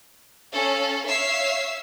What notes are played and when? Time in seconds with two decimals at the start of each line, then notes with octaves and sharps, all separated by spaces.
0.54 C#4 A4 F5
1.07 C#5 E5 F5 E6 C7